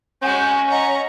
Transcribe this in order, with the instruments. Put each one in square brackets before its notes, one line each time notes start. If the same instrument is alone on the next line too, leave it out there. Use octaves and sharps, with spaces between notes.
[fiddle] G#3 F#4 [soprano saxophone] C#4 [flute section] F#5 G#5 G6
[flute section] D#5 F#5 [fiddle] A#5 C#6